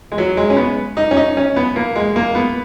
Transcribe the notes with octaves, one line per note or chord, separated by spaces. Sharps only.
G#3
F#3
G#3
C#4
B3
D#4
C#4
D#4
C#4
B3
A#3
G#3
A#3
B3